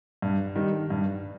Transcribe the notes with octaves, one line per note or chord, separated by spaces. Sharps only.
G2
D#3 G3
G2